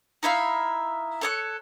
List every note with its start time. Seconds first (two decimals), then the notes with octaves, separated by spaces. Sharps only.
0.23 D#4 E4 E5 F5
1.21 A4 C#5 F#6